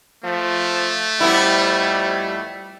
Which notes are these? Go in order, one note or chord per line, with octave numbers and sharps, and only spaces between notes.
F3 A3
F2 G3 B3 E4